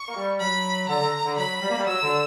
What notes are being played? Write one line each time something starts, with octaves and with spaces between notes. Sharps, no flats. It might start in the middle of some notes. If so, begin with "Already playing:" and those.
Already playing: C#6
A#3
G3
F#3 B5
D3 A#5
D3
D3
F#3 B5
G3
A#3
G3
F#3 E6
D3